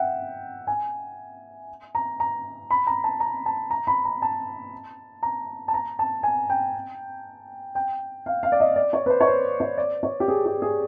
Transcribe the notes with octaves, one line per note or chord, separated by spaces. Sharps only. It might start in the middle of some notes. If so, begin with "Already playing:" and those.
Already playing: E5 F#5 G5
G#5
A#5
A#5
B5
A#5
A5
A#5
A5
A#5
B5
A#5
A5
A#5
A5
A#5
A5
G#5
G5
G5
F5
F5
D5
D#5
D5
C#5
B4
C5
C#5
C5
C#5
D5
C#5
G4
G#4
G4
G#4